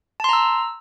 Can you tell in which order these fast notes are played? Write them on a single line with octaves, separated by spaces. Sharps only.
A5 C6 A#5 E6